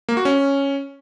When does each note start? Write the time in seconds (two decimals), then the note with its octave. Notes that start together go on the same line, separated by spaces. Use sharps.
0.09 A#3
0.17 F#4
0.25 C#4